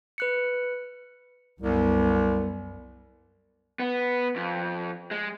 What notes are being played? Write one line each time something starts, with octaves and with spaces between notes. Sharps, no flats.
B4 F#6 C#7
C2 F#2 B3
B3
F2
G#3